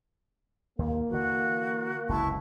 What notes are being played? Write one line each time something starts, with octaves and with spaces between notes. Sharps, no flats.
D#2 A#3
D3 E3 F#4
F#1 C#2 C3 E4 A5 C#6